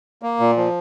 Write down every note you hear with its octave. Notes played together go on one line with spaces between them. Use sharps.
A#3
A#2
F3